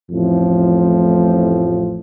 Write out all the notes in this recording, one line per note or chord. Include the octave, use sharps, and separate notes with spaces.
A1 F2 A2 F3